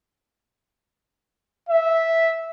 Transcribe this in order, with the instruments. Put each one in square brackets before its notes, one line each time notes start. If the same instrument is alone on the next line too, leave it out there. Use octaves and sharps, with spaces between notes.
[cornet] E5